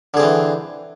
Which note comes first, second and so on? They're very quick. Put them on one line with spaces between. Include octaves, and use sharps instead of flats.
D3 G#4 C4 E3